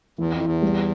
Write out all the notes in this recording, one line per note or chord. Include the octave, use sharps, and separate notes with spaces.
E2 E3
F2
E2 E4
G3